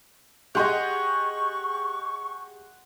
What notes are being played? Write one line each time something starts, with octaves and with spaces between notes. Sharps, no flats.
G4 G#4 D#5 F#5 C6 C#6